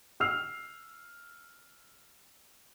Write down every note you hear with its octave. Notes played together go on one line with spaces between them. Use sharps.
E6 F6 C7 F7